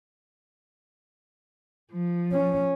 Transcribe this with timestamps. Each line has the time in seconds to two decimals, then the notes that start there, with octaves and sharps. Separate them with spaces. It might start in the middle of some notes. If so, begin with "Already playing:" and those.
1.92 F3
2.32 C#4